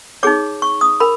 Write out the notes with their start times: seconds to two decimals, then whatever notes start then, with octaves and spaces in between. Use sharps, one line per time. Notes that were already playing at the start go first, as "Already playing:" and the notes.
0.23 D#4 G#4 C#5 D6
0.62 C#6
0.81 D#6
1.00 A#4 B5